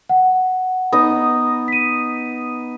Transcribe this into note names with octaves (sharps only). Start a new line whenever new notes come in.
F#5
B3 D#4 D#5
B6 D#7